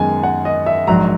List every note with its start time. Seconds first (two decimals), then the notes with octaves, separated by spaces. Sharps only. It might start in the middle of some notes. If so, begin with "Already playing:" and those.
Already playing: F#2 D#3 G#3 B3 G#5
0.23 F#5
0.45 D#5
0.66 E5
0.87 A#1 G#2 F#3 A#5